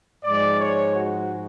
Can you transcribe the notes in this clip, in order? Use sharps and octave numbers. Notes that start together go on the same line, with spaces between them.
G#2 F3 G#3 D5
C#5
F#4